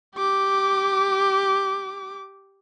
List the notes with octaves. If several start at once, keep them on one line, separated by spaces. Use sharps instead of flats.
G4 D6